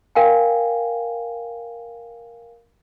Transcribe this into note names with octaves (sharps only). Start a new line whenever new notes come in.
A#4 F5 G5 G#5